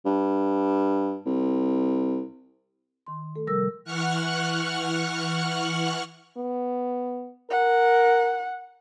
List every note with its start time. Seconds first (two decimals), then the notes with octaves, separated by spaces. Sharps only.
0.06 G2
1.26 C2
3.07 D#3 C6
3.36 A3 A4
3.47 C3 F3 G3 A#4 E6 A#6
3.84 E3 F#5 C#6 F6 F#6
6.37 B3
7.50 A#4 F#5